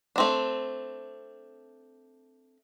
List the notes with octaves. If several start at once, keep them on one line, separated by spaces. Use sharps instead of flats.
A3 C4 D4